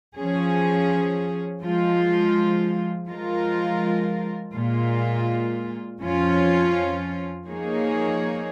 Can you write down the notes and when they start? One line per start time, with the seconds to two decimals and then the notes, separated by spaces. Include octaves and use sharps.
0.16 F3 C#4 G#4
1.63 F3 G#3 F4
3.08 F3 G#3 F4 A#4
4.54 A#2 G#3 F4
6.00 F2 F3 C#4 F4
7.47 F3 A#3 D#4 G#4 C#5